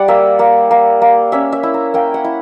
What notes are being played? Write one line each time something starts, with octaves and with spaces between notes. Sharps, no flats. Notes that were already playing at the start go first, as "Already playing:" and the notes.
Already playing: G3 D5 F#5
A#3 E5
A#3
A#3
A#3
C#4 E5
E5
E4
A#5
A#3 G5
F#5
E4